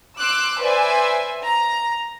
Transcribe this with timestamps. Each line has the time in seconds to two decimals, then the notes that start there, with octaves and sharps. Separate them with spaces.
0.19 C6 D6 E6 F#6
0.62 B4 C5 D5 E5 G#5
1.43 A#5